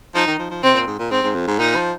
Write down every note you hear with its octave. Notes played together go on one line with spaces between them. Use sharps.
F3 D#4
D#3
F3
F3
C3 C4
A#2
G#2
A#2
G#2 C4
G#2
F2
G#2
A#2 D#4
F3